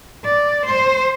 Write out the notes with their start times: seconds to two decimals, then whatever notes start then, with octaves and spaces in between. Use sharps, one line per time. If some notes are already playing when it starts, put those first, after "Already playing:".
0.24 D5
0.66 C5